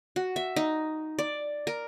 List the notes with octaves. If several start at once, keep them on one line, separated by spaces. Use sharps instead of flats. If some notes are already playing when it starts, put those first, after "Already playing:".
F#4
E5
D#4
D5
A#4